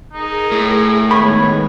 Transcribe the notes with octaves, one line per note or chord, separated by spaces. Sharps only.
D#4 G#4 A#4
A2
D#3 G#3 B3 C#5 B5